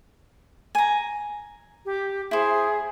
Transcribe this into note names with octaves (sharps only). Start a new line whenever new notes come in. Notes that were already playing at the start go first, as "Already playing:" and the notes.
G#5 A#5
G4
E4 G#4 C5